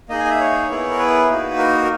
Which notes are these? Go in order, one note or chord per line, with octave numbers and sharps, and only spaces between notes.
A#3 D#4 G#4 D#5
G#5
D#5
E5
C#5
B3 E4 G#4
A#4
B4
A#3 D#4 F#4
A#4